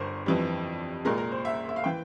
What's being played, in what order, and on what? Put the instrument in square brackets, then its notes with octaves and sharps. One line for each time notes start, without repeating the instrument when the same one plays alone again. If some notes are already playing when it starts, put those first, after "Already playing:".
Already playing: [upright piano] G1 G2 A#4 C5
F2 E3 G3
C2 A#2 G#3 A#4
A#4
C5
E5
E5
F5
E3 G5